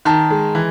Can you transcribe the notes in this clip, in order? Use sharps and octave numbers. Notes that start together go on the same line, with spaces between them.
D#3 A5
G#3
E3